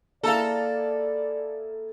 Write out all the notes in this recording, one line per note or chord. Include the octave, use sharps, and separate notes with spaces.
A#3 E4 G#4 A4 D5 F5 A5 A#5